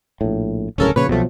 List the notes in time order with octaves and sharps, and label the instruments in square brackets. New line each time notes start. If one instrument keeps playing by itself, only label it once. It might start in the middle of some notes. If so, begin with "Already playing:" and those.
[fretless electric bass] A#1 A2
[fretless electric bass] D1 C2 C#3 [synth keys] C#4 A4 A#4
[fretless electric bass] A#2 C#3 F3 [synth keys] B4 C#5
[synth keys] C2 A3 [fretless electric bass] B2 F3 F#3